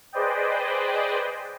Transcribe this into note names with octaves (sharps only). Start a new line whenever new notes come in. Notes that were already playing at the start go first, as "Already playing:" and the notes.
G#4 B4 C5 D5 D#5 G5